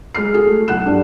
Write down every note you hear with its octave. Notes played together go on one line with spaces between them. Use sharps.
G#3 F6 C7
F#4 G#4 A4
A3
B1 F#5 F#6 E7
G2 G3 D4